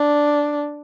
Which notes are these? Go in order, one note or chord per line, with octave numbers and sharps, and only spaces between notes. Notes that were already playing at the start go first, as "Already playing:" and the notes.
Already playing: D4